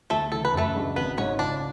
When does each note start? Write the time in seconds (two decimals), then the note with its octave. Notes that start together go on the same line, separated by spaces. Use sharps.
0.10 D2 A3 A4
0.32 C#3 E3 A4
0.45 B4
0.53 F#2 A3 A4
0.75 C#3 G#3 D4 F#4
0.96 G#1 B3 B4
1.17 G#2 G#3 C#4 C#5
1.39 C#2 D4 D5